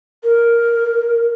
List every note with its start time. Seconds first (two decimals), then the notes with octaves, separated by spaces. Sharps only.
0.23 A#4